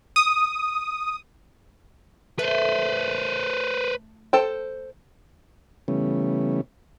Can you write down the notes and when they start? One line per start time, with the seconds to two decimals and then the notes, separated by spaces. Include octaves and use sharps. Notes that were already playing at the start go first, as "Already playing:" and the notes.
0.16 D#6
2.39 A3 B4 C5
4.33 A4 C5 G5
5.88 C#3 E3 G3 A3 B3 C#4